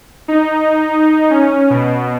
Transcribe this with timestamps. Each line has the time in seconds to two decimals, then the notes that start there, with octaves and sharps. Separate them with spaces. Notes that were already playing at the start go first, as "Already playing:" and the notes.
0.28 D#4
1.30 C#4
1.70 B2